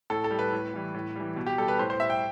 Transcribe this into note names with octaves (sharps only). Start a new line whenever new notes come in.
A2 A4
A4
G3
B4
A2
E3 G3
A2
E3 G3
B2
G4
G3 A4
B4
A2 C5
C5
G3 E5
G5